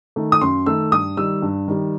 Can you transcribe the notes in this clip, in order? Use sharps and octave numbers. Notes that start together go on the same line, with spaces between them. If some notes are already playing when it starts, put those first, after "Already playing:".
D#3 A3
D#6
F#2 C6
D#3 A3 E6
G2 D#6
D#3 G3 E6
G2
D#3 G3